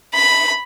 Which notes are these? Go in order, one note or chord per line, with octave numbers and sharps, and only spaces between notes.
B5